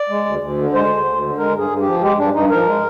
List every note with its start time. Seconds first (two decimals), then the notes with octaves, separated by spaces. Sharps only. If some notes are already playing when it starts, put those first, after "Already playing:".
Already playing: D5
0.09 G#3
0.25 D2
0.41 D2
0.57 D3
0.73 G#3 C5
0.90 D2
1.06 D2
1.22 D3
1.38 G#3 A#4
1.54 G2
1.59 G#4
1.70 G2
1.81 F3 G4
2.02 G#3 G4
2.18 G2 D4
2.34 G2 D#4
2.50 F3 A#4
2.67 G#3